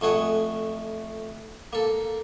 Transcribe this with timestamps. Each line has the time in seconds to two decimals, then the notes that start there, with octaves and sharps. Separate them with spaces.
0.01 F2 A3 G#4 F#5
1.73 A#3 A4